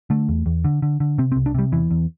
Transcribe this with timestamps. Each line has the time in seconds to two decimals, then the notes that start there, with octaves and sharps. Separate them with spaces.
0.10 D3 A3
0.29 E2
0.46 E2
0.64 D3
0.82 D3
1.00 D3
1.18 C3 C4
1.32 C4
1.36 C2
1.46 D4
1.54 C3 G3
1.72 E2 E3
1.91 E2